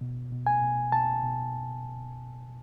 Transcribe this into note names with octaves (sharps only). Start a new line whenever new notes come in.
B2
B2
G#5
B2
B2 A5
B2